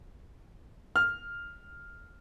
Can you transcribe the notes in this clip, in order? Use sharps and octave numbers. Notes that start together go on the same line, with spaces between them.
F6